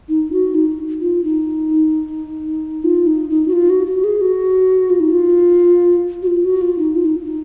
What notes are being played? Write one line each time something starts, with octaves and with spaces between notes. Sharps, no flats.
D#4
F#4
D#4
F4
D#4
F4
D#4
D#4
F#4
F4
F#4
F#4
G#4
F#4
F4
D#4
F4
F#4
F4
F#4
F4
D#4
F4
D#4
D#4